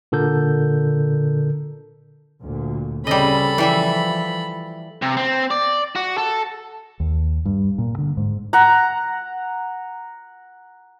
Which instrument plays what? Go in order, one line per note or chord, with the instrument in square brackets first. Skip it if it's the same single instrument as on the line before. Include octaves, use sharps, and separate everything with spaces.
[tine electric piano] A#2 D3 A4 A#4 G6
[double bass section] D2 A#2
[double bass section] C#3 C4 C#4 [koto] G3 D#5 [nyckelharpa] A4 B5
[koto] E3 G3 E5 [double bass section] F3
[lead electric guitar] C3
C4
D5
F#4
A4
[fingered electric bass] D#2
G2
A#2
D3
G#2
[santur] F#5 A#5